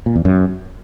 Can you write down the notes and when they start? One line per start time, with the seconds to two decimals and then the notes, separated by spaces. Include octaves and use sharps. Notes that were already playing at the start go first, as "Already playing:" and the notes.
0.06 A#2
0.16 E2
0.25 F#2